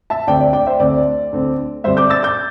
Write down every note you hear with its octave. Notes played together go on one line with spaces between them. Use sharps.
E5 A5
D2 D3 C4 D5 G5
D5
D5 G5
C5 E5
D2 D3 C4 D5
D2 D3 C4
G2 D3 G3 C4 C5 E5
D6 G6
E6 A6
D6 G6